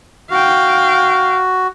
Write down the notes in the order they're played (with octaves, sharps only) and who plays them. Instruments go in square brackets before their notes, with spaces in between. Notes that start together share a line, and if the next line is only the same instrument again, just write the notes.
[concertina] F#4 [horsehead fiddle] F5 G5